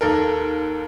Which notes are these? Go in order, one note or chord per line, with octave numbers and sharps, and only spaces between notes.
D#2 A4 A#4